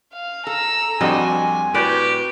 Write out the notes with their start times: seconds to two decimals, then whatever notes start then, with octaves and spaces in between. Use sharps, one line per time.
0.13 F5
0.47 A4 A#5 E6
1.01 F2 G3 C4 D4 F#4 D#5 G#5
1.74 A2 F#4 G4 B4 C5 D5